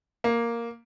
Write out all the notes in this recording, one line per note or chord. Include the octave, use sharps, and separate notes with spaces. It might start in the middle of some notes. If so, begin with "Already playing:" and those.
A#3